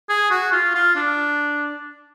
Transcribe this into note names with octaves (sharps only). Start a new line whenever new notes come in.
G#4
F#4
F4
F4
D4